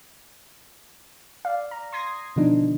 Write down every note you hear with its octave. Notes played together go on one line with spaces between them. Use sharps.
D5 F5
A#5
C6 D#6 G#6 A#6 C7
B2 D3 D#3 F3 D4 D#4